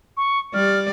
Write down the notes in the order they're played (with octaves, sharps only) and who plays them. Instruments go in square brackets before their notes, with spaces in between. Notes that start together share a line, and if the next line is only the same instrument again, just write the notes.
[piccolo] C#6
[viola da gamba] G3 D5 [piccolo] F6